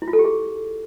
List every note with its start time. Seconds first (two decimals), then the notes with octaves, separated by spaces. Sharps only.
0.02 E4
0.08 F4
0.13 A4
0.19 G4
0.25 G#4